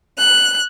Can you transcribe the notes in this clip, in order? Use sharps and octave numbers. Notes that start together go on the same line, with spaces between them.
F#6